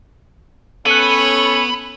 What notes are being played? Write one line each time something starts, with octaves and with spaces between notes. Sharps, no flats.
B3 C#4 A4 C#5 B5 F#6 C#7 D#7